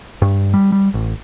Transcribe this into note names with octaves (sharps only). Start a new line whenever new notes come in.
G2
G3
G3
A1